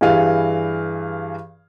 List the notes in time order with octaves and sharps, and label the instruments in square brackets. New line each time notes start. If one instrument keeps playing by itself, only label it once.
[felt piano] G2 E3 G#4 F5